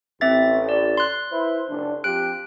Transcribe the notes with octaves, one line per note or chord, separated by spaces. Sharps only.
A1 C4 E5 A6
D5
C6 F#6
E4 B4 C5
F#1 D4
F3 C4 G4 F#6 D7